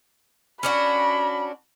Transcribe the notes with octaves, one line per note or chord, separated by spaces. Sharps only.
C#4 D4 F#4 B5